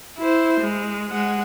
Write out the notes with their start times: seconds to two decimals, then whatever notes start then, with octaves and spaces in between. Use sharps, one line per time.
0.18 E4 C5
0.60 G#3
1.10 G#3 F#5